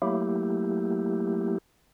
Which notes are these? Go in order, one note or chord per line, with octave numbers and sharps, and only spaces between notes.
F#3 A3 A#3 E4 G4